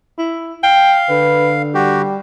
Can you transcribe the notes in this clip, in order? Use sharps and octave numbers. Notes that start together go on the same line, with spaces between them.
E4
F5 G5
D3 B4
G3 F#4 G4